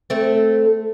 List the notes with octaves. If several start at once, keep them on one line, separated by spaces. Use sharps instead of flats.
A3 C4